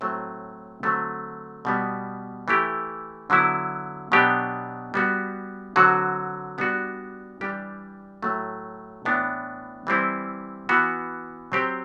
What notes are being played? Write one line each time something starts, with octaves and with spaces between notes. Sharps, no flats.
A2 F#3 A3 C4
D3 F#3 A3 C4
B2 G3 B3
E3 A3 E4 G4
D3 F#3 B3 E4
B2 F#3 B3 D4 G4
G3 B3 F#4
D3 F#3 C4 F#4
G3 B3 D4 F#4
E3 G3 D4 G4
A2 F#3 A3
A2 E3 B3 D4
E3 G3 C4 E4
E3 B3 F#4
F#3 C4 G4